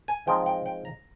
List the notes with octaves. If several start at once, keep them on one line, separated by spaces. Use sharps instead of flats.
G#5
F3 G#3 C4 D#4 G5
G5
G5
A#5